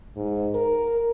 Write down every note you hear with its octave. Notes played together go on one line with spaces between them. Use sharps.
G#2
A#4